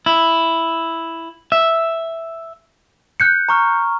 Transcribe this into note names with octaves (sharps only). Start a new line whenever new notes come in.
E4
E5
F#6 G6 C#7
A#5 C#6 F6